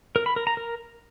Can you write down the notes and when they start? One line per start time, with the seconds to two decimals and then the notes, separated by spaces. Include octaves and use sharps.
0.16 A#4
0.26 B5
0.36 A#4
0.47 A#5
0.57 A#4